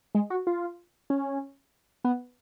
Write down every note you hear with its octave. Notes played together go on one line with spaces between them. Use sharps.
G#3
F#4
F4
C#4
B3